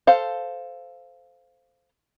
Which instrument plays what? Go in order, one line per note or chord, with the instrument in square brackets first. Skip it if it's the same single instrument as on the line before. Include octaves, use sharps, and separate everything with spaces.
[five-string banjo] A4 C5 F5